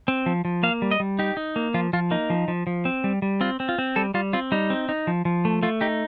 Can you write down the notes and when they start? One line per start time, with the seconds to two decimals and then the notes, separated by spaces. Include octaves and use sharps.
0.08 C4
0.26 F3
0.45 F3
0.63 A#3 F5
0.82 G3
0.91 D#5
1.00 G3
1.19 D#4 G4
1.37 D#4
1.56 A#3
1.74 F3 F4
1.93 F3 F4
2.11 A#3 D#4
2.30 F3
2.48 F3
2.67 F3
2.85 C4
3.04 G3
3.22 G3
3.41 C4 F4
3.60 C4
3.69 F4
3.78 C4
3.96 G3 A4
4.14 G3 F4
4.33 C4 F4
4.52 G3 D#4
4.70 C4
4.89 D#4
5.07 F3
5.25 F3
5.45 A3
5.63 A3 F4
5.81 D#4 G4